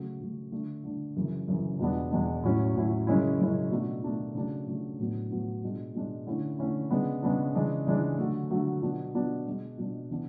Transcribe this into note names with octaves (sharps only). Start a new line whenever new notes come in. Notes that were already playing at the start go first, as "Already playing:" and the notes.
Already playing: C#3 F#3 A3
C#3 F#3 A3
D3 A3 D4
D3 A3 D4
F#2 C#3 E3
F#2 C#3 E3
E2 B2 G#3 B3 D4
E2 B2 G#3 B3 D4
A2 F#3 C#4 E4
A2 F#3 C#4 E4
F#2 C#3 G#3 C#4 E4
F#2 C#3 G#3 C#4 E4
B2 A3 D4
B2 A3 D4
C#3 F#3 A3 D4
C#3 F#3 A3 D4
A2 F#3 B3 D4
A2 F#3 B3 D4
B2 G#3 D4
B2 G#3 D4
D3 A3 C#4 E4
D3 A3 C#4 E4
C#3 G#3 B3 D4
C#3 G#3 B3 D4
C#3 E3 G#3 D4
C#3 E3 G#3 D4
D3 F#3 A3
D3 F#3 A3
B2 F#3 B3 D4
B2 F#3 B3 D4
B2 G#3 D4
B2 G#3 D4
C#3 E3 B3 D4